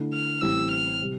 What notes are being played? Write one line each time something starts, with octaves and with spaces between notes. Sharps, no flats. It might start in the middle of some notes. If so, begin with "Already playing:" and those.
Already playing: D3 A3 E4
F6
A1 A2 E3 G3 C4 E6
F6
C3 G3